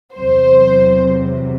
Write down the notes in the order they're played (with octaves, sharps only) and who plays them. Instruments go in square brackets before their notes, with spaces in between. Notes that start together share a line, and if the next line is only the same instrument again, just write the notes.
[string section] E2 C3 F#3 C5